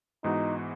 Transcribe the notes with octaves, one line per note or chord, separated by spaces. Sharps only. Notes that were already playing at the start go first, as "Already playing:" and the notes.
G#2 E3 B3 D#4 F#4